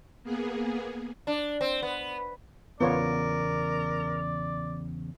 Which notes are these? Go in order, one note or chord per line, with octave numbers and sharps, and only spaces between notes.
A#3 B3 G#4
D4
C4
B3
E2 A#2 C#3 B3 F4 A#4 C#5 D5